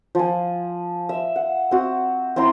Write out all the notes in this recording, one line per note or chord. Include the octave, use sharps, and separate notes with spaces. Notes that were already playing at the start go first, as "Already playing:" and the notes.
F3 G#5
E5
F#5
C4 F#4
C4 E4 A#5 C6